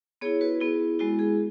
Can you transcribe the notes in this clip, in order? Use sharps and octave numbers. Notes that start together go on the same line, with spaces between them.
B3 E4 G#4 C#5
F#4 B4
B3 E4 G#4
G#3 B3 E4 F#4
G#4